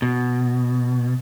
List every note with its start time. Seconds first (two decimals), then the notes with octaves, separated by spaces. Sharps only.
0.02 B2